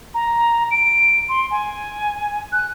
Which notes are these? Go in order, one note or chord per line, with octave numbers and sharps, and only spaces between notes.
A#5
D7
C6
G#5
F#6